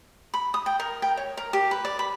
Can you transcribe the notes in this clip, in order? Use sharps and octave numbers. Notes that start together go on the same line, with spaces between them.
B5
D#6
G5
A#4
G5
C#5
A#4
G4
B4
D5
B5